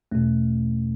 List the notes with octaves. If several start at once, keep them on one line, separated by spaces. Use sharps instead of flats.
E2 B2 A3 C#4